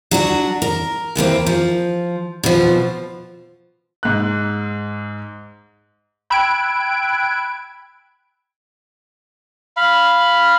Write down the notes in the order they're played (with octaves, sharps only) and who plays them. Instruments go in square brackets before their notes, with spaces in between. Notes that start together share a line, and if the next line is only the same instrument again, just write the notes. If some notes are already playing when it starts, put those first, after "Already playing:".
[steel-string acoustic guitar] F#3 D4 F#4
A#4
D#2 E3 A#3 C4
F3
B2 F3
[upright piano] G#2 F#6
[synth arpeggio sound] G5 B5 E6 F#6 G#6 D7
[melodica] F5 B5